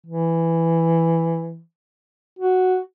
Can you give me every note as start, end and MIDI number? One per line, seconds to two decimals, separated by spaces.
0.06 1.60 52
2.39 2.79 66